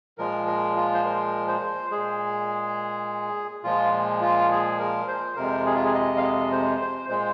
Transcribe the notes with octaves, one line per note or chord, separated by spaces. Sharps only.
A#2 F3 G#3 A#4
A#4
F4
C5
A#4
C5
A#2 G#3 G#4
A#2 F3 G#3 F4
F4
G#4
A#4
C5
F2 C3 G#3 A#4
G#4
F4
G#4
D#5
F5
D#5
C5
C5
A#2 G#3 C5